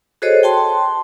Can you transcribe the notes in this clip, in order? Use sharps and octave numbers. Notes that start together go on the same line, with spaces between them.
F#4 G#4 A4 C5 C#5 D#5
G5 A5 C6